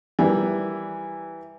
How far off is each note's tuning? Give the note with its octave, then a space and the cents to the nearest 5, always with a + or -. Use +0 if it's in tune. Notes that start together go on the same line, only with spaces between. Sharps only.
E3 +0 G3 +0 A#4 +0